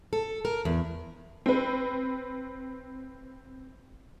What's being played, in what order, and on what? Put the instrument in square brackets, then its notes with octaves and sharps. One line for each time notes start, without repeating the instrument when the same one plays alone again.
[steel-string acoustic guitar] A4
A#4
E2
[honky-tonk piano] C4 B4